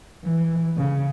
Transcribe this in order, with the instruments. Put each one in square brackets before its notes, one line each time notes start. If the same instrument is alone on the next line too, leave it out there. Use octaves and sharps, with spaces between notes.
[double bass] E3
C#3